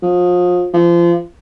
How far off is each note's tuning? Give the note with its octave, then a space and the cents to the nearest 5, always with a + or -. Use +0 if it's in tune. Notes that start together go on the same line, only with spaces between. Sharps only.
F3 +35
F3 -30